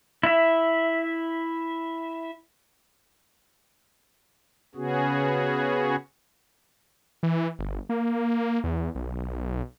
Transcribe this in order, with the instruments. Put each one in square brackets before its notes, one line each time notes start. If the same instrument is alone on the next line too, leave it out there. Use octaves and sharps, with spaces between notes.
[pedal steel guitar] E4 E5
[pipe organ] C#3 B3 C#4 F#4 G#4
[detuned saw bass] E3
G1
A#3
E2
B1